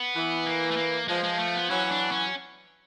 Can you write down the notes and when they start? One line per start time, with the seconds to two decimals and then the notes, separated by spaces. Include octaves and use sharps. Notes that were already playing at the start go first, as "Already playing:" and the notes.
Already playing: B3
0.15 E3
0.46 A#3
0.71 A3
0.77 A#3
1.08 F3 G#3
1.23 G#3
1.39 A3
1.55 B3
1.70 E3 F#3 C#4
1.91 D4
2.12 C#4